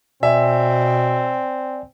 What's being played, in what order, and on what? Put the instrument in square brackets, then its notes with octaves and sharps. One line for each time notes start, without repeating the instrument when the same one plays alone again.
[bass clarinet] B2 [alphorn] C4 [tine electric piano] D5 G#5 [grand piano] E5